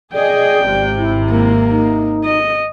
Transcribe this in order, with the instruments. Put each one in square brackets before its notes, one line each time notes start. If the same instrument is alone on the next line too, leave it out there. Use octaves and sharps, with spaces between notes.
[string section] G#4 D#5 [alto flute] D5 [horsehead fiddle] G5
[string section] G#1 C3
[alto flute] E4
[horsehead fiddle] A#3
[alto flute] D#4
[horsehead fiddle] D#5